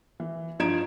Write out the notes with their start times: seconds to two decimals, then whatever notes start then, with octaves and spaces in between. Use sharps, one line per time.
0.20 E3
0.59 G2 F3 D#4 G#6 D7 E7